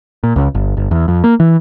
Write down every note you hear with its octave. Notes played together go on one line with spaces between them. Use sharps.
A#2
C#2
G1
G1
E2
F2
A#3
E3